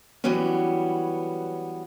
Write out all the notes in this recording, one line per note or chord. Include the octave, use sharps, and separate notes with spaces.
E3 F#3 G3 B3 C#4